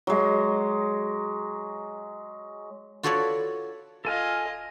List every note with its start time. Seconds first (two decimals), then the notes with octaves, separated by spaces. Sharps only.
0.07 F#3 G#3
3.03 F4 F#4 A4 B4 C#5 D5
4.05 D1 F4 A4 D#5 G#5 F6